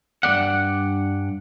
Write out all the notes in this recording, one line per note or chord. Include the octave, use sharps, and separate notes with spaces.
G2 A3 D5 F#5